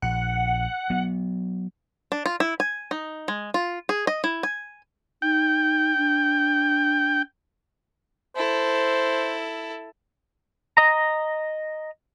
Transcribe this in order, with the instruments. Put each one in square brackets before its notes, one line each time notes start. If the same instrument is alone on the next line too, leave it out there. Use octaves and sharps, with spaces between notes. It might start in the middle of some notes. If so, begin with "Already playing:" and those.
[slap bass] A#1 [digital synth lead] F#5
[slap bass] F#3 B3
[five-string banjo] D4
F4
E4
G#5
D#4
G#3
F4
G#4
D#5
E4
G#5
[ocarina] D#4 [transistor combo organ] G5
[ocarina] D4
[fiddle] E4 A4 [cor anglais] C5
[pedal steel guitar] D#5 A#5